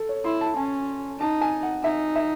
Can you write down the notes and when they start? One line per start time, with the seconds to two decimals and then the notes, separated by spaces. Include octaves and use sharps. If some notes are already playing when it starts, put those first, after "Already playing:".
Already playing: A4
0.09 C#5
0.25 E4 C6
0.41 A5
0.57 C#4 G#5
1.20 D#4 A5
1.41 G#5
1.63 F#5
1.84 D#4 E5
2.16 E5